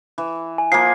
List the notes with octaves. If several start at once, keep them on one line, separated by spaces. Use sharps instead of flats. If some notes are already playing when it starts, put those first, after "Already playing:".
E3
G#5
F3 A#3 C7